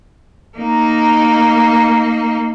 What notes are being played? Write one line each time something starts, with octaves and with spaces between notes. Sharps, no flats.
A#3 D#4